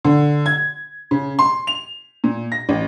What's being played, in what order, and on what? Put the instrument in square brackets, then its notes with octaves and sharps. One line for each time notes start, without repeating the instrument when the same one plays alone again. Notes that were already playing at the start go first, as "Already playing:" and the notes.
[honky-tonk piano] D3
G#6
C#3
C6
F7
A#2
A#6
A1